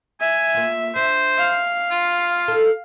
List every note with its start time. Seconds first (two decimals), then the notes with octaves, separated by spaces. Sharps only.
0.21 E5 G#5
0.54 A#3 F4
0.96 D4 C5
1.38 F5
1.91 F4
2.48 D#4 A4